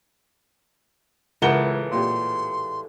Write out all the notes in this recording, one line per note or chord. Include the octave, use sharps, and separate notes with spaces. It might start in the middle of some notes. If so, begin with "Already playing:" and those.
C#2 A2 E3 G#3 A#4 F#5 G7
A#2 G4 C6